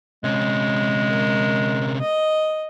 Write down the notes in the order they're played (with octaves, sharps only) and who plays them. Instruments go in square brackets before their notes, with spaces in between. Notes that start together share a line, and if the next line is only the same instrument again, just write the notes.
[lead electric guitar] C3 C#4 [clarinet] G#3
[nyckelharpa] A#4
D#5